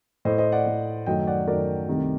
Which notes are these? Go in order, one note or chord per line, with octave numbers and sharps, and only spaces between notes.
A2 A3 C5 D#5
C5 D#5
D5 F#5
A2 A3
F#2 D#3 F#3 A3 D#5 G5
D5 F#5
F#2 D#3 F#3 A3 A#4 D5
C2 C3 D#3 A3